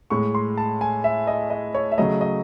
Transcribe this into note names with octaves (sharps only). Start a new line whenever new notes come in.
A2 G#3 C#6
C6
A5
G#5
E5
D#5
D#5
C#5
E5
C#3 F#3 A3 D#5
D#5